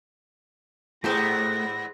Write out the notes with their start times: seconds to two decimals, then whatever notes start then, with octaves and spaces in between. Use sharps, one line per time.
1.04 G#2 A3 B3 G4 G#4 C5 A#5 A#6